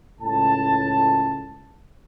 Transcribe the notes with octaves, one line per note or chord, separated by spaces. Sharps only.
C#2 A2 A5